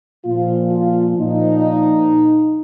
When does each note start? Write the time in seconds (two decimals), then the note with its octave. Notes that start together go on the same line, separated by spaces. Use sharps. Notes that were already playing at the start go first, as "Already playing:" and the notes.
0.25 A#2 F3 F4
0.72 F4
1.17 A#2 F3 D#4